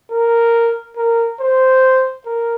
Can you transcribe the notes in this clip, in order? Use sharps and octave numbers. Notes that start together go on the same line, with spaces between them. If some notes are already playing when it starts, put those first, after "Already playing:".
A#4
A#4
C5
A#4